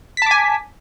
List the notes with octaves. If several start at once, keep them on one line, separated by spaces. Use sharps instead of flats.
G#5 A5 D6 B6